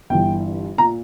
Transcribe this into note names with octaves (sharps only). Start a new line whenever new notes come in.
G1 G2 E3 G5
A#2 A#5